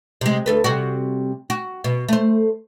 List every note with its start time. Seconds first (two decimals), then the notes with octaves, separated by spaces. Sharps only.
0.21 C3 G#3
0.46 D2 A4 B4
0.64 C3 G3 F#4
1.50 F#4
1.84 B2
2.08 A3 C5